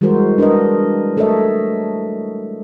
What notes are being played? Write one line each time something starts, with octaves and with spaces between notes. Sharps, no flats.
E3 G3 G#3 F#4 A#4 C5
D4 A#4 B4 D#5
A3 A4 A#4 C#5 D#5 E5